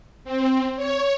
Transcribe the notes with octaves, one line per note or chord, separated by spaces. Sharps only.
C4
C#5